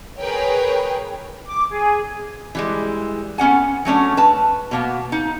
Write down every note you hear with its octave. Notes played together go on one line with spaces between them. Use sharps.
G#4 A#4 B4 C#5 G5
D6
G#4
E3 G3 G#3
B3 C#4 F#5 G#5
F#3 A3 C#4 D4
B4 A5
B2 A#3 B3
D#4